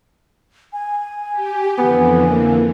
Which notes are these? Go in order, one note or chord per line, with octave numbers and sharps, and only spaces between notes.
G#5
G4
F2 D3 E3 B3
A#3